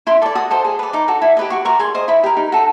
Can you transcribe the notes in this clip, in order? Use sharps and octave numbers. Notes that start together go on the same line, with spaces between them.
E4 C6
A4 D5 D6
F#4 D#6
A4 C5 D#5
G#4
B4 D5
D#4 D6
F#4 A4
E4
G4 B4 D#5
F#4 C#6
A#4 D5 C#6
G#4 C6
C5 D#5
E4 B5
G4 A#4
D#4
F#4 A4